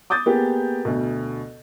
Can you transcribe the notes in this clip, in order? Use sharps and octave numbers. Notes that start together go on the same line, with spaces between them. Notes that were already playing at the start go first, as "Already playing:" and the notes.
D6 D#6 G6 A6
A#3 B3 G4 G#4
D2 B2